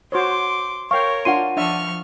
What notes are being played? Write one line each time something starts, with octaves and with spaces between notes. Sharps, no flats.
F#4 C5 C#5 C6 D6
A#4 C#5 F5 G5 C#6
D4 F4 F#5 C6 D#7
F3 D4 E5 C#6 F6